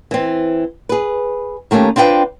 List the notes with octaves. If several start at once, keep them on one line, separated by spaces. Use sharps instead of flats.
E3 C4
G#4 B4
D#3 A3 A#3 C#4 G4
C4 D4 F4 B4 G5